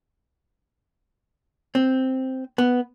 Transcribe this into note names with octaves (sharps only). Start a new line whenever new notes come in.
C4
B3